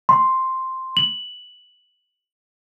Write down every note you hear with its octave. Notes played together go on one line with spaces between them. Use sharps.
C6
F#7